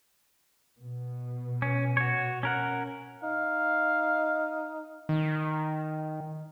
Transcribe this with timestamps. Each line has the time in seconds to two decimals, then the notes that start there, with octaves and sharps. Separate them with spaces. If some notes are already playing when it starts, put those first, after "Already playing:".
0.81 B2
1.62 C#4
1.97 F#4 C#5
2.43 C#4 A#4 F#5
3.23 D#4 F5
5.09 D#3